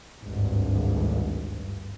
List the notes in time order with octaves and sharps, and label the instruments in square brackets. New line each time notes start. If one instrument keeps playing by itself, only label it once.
[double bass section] G#1 D2 G2